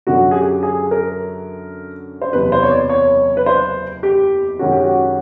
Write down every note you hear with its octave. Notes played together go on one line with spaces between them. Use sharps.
F#2 D3 F#3 F#4
G#4
G4
G#4
A#4
C5
F#1 E2 C3 B4
C5
C#5
D5
C#5
B4
C5
G4
F#2 D#3 G#3 C#4 F#4
G4
F#4